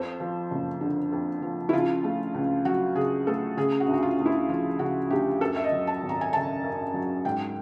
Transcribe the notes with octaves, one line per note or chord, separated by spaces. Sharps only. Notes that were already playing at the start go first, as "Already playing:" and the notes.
Already playing: F2 C5
F3
F#1
D3
F2
F3
E4
C#3 F4
A3
C#2
F#3 F#4
C#3 G#4
A3 A4
C#3 G#4
F#4
D2
F#4
F4
D2
E4
F3 F4
C#3 F#4
D2 G4
F#2 A4
E5
D#5
F#3
A5
G#1
A#5
G#5
C#3 A5
F#2
F#3
G#2 G5